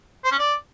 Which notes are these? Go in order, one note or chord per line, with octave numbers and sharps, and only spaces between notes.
C5
C#4
D5